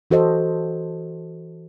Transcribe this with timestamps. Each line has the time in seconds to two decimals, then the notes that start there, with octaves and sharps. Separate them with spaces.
0.11 E3 F#4 A4 C5 D#5